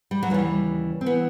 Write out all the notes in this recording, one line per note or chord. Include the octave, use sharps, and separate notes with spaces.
G3
F#3
D#2 C#3 E3 G3
C4
E3 B3